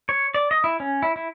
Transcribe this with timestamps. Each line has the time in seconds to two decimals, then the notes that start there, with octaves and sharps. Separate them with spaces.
0.09 C#5
0.34 D5
0.51 D#5
0.64 E4
0.80 C#4
1.03 E4
1.16 E4